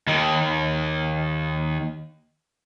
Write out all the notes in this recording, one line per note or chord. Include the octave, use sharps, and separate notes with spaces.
D#2 D#3